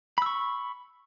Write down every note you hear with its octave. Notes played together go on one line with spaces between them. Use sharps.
B5 C#6 E6